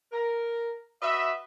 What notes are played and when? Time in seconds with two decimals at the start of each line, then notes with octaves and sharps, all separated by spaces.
0.12 A#4
1.02 F#4 B4 D#5 E5